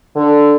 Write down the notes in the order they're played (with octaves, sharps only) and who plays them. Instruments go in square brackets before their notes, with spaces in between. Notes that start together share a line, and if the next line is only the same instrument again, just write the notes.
[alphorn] D3